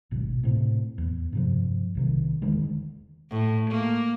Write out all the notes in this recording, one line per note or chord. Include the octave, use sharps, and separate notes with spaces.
D1 G#1 B2
A2 C3
E2
G2 C3 F3
B1 C3 D#3
E1 D3 D#3 G#3
A2
A#3